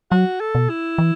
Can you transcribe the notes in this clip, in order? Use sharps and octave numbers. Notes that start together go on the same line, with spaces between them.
F#3 F#4
A4
B2
E4
E3